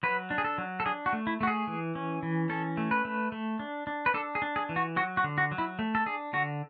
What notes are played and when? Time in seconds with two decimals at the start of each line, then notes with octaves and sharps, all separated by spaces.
0.03 F#3 B4
0.30 D4
0.38 G#4
0.45 A4
0.58 F#3
0.80 A4
0.85 D4 G#4
1.06 F#4
1.13 A3
1.27 E4
1.41 A3 F#4
1.47 G#4
1.67 E3
1.95 C#4
2.23 E3
2.49 C#4 A4
2.77 A3
2.91 B4
3.05 A3
3.32 A3
3.59 D4
3.87 D4
4.06 B4
4.14 D4 A4
4.35 G#4
4.42 D4
4.56 G#4
4.69 E3
4.76 F#4
4.96 F#3 F#4
5.17 F#4
5.24 D3
5.38 F#4
5.52 F#3
5.58 E4
5.79 A3
5.95 A4
6.06 D4 G#4
6.33 D3 F#4